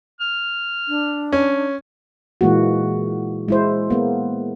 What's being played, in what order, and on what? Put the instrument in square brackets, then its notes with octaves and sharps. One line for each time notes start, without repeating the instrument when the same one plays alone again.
[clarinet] F6
[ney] D4
[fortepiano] C#4
[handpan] A#2 E3 G#3 A#3 F#4
G#3 E4 C5
A#3 B3